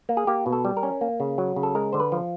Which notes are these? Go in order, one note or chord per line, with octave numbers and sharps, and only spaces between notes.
A#3
G#4
A#3 G4
B2
A4
G3
A#4
C#4
A#3
C#3
F#3
C#3
A4
G#3 A#4
D3 C5
B4
F3